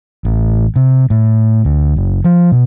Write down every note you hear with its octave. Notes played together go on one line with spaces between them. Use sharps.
A1
C3
A2
D2
F#1
F3
B2